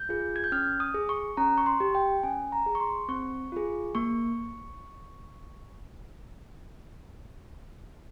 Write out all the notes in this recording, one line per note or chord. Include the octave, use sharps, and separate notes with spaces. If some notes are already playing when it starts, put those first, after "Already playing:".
Already playing: G6
F4 G#4
G#6
G6
C#4 F6
D#6
G#4
C#6
C#4 A#5
C#6
C6
G4
G5
C#4 G#5
A#5
G#4
C#6
C6
C4 C#6
F4 G#4
A#3 C#6